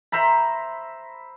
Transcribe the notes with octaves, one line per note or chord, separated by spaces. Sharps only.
C5 E5 A#5 B5